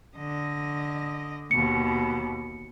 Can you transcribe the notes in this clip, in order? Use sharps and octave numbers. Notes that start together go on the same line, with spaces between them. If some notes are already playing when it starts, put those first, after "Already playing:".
D3 D#5
D#2 B2 C#7